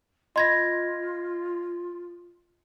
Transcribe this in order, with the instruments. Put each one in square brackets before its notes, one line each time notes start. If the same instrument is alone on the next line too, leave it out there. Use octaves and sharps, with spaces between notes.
[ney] F4 [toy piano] D#5 B5 [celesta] C6 G#6 A#6